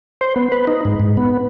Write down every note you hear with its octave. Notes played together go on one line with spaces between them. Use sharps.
C5
B3
B4
D#4
G#2
G#2
B3